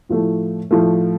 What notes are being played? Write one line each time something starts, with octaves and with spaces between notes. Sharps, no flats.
A2 F3 A3
A2 F3 A3